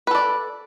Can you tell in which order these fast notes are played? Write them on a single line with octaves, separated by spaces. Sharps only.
B4 A4 D5